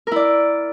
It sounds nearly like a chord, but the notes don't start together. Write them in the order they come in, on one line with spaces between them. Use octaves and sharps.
A#4 E4 D5